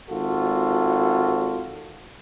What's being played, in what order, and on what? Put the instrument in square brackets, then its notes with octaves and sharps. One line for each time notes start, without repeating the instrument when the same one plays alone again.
[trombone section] G#1 F4 F#4 A4